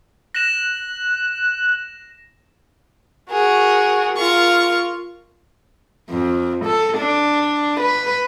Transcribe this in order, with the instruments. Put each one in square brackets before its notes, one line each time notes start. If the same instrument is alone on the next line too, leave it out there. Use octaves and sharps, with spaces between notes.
[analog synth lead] F#6 [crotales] A#6 E7
[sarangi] F#4 [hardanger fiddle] G#4 A#4
[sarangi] F4 [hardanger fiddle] A#4 C#6
[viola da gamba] F2
A4
D4
B4